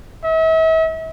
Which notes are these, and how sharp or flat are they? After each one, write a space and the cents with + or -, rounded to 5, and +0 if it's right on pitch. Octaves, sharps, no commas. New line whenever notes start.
E5 -40